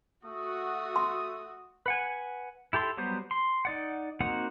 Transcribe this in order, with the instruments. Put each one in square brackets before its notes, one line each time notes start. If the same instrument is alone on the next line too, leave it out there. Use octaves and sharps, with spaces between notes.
[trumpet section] A3 D#6 [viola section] F#4
[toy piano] C6
[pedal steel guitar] B4 F#5 G#5
E4 G4 A4 C6
F#3 G3 B3 C5
C6
D#4 D5 F#5
A#3 C4 D#4 F#4 F#5